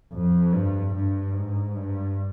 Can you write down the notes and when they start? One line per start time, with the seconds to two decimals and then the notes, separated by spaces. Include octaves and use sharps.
0.13 F2
0.53 G2
0.94 G2
1.35 G#2
1.76 G2